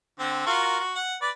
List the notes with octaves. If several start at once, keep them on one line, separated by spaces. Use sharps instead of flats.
D3 C4
F4 F#4 A#4
F#4
F#5
B4 D5